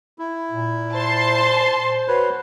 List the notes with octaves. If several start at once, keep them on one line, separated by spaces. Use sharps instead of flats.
E4
A#2
C5 A5 C6
C5
F#4 B4 C#5